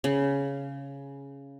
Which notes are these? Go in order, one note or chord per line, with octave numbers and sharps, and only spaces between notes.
C#3